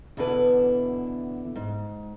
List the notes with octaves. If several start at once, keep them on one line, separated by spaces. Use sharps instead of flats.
E2 B2 D3 E4 B4 A5
G#2